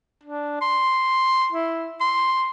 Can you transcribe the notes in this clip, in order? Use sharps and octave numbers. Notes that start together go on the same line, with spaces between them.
D4
C6
E4
C6